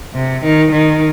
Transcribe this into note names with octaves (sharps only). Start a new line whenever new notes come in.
C3
D#3
D#3